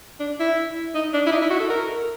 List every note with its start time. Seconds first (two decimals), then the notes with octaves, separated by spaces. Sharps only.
0.20 D4
0.39 E4
0.95 D#4
1.13 D4
1.26 E4
1.31 D#4
1.41 E4
1.50 F#4
1.60 A4
1.69 A#4